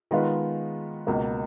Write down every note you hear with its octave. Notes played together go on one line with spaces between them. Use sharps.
D#3 G#3 B3 F4 B4
C#2 B2 A#3